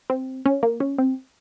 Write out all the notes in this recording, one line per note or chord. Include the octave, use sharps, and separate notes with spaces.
C4
C#4
A#3
C#4
C4